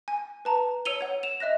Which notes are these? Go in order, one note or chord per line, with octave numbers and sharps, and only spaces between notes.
G#5
B4 A5 A#5
C#5 E6 C#7 D#7 F7 G7
C#5 F#5
E7 F7
D#5 E5 F#6 A#6